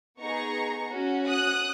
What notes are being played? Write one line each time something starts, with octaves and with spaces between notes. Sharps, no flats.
B3 D#4 G#4 A#5 C#6
C#4 F#4
D#6 F#6